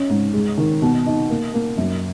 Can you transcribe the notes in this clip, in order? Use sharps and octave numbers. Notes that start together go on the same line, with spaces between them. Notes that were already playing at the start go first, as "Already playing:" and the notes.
Already playing: C#4
G#2
G#3
D#3
B2
D#4
A#3
A#3
F#2